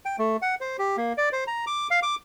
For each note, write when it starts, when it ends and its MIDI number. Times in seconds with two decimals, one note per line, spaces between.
0.05 0.16 79
0.19 0.37 57
0.42 0.55 78
0.61 0.77 72
0.79 0.97 67
0.97 1.13 58
1.18 1.29 74
1.32 1.44 72
1.47 1.65 82
1.67 1.88 86
1.91 2.00 77
2.03 2.15 86